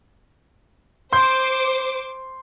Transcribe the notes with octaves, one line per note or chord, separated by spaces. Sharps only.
C5 C6 D6 G6